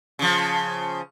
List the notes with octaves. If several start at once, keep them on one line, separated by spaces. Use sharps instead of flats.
C#3 F3